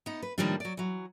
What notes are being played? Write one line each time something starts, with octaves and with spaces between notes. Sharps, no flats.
B3 D#4
B4
A2 D#3 F3 G3 A#3 D4
F#3 D5
E3 F#3